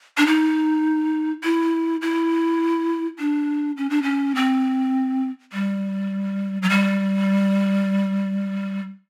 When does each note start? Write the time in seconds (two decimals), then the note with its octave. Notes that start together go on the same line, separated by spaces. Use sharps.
0.18 D4
0.27 D#4
1.44 E4
2.02 E4
3.19 D4
3.77 C#4
3.90 D4
4.03 C#4
4.36 C4
5.53 G3
6.62 F#3
6.70 G3